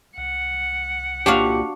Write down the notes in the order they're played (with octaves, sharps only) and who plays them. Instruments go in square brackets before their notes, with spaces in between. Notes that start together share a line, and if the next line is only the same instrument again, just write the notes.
[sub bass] C2 [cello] F#5
[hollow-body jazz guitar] A#2 G4 [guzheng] D4 F#4 F5